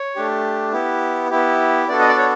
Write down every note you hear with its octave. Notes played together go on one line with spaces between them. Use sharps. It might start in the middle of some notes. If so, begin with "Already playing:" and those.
Already playing: C#5
A3 D4 G4
B3 E4 G4
B3 E4 G4
B3 D4 F#4 A4 D5
D#5
D5
C#5